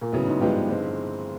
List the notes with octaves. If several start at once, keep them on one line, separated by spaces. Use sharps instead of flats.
A#2
A2 C#3 F#3 B3
G#2
G2 F3 G#3 B3 D4 G4
D3 F3 G#3 C4